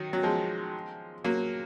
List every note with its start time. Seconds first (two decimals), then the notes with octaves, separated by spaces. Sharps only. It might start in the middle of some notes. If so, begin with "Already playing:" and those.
Already playing: D#3 F#3
0.13 F#3
0.23 F3 G#3
1.24 F#3 A#3